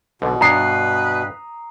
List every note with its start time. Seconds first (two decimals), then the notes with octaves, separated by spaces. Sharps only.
0.22 B1 B2 D3
0.41 G2 D4 B4 C#5 A#5 D#6 C7